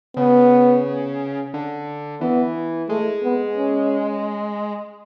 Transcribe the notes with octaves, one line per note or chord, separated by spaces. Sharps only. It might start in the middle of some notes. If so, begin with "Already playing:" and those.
C#3 B3
D3
E3 B3
G#3 A3
B3
C#4